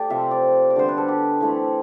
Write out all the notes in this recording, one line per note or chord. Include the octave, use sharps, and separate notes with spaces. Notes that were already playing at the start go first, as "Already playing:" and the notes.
Already playing: A3 G4 D5
C3 F3 C4 E5
D5
D5
D3 G3 B3 C5
B4
A4
G4
E3 A3 C4